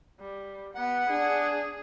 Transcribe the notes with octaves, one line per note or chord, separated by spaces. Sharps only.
G3
B3 F#5
D4 G#4